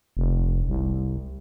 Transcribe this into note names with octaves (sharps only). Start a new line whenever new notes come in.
F1
C2